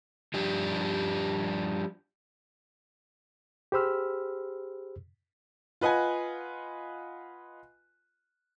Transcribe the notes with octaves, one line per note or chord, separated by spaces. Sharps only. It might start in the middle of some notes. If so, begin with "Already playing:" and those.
F3 G3 D4 G4
G4 G#4 C5 B5 E6 F6
F4 B4 D#5 F#5 G#5